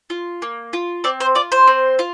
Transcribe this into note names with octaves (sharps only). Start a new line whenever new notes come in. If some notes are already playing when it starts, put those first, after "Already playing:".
F4
A#3
F4
C4 D5
C5
F4 D5
C5
C4
F4